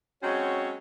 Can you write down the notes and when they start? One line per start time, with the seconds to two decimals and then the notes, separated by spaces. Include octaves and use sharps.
0.23 F#3 G#3 C4 C#4 F#4 C#5